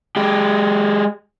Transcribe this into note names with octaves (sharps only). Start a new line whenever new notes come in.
G#3 G4